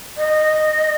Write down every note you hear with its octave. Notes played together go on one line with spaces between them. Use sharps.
D#5